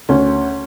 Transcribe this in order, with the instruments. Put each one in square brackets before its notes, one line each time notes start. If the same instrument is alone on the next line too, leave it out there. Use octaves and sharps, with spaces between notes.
[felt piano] D2 C#4